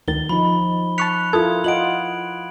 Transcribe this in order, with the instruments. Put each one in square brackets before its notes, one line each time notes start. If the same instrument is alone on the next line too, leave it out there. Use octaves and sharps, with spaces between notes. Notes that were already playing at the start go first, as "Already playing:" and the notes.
[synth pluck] D2 D#3 A6 [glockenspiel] G7
[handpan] F3 D#4 [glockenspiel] B5
[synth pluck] A5 C#6 B6 [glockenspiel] F#6 C#7 F7
[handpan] E4 F4 A#4 [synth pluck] A4 [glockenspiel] D#6 G#6
[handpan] F4 D#5 F#5 [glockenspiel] D7 F#7